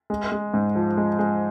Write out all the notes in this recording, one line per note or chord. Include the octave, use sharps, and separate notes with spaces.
G#3
G#3
G#2
F3
G#3
G#3